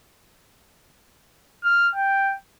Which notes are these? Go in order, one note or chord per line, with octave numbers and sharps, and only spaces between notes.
F6
G5